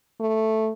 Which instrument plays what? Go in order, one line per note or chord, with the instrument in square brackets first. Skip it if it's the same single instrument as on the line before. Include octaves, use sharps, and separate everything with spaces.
[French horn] A3